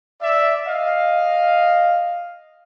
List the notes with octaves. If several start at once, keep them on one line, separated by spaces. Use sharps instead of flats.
D5 E5
D#5 F5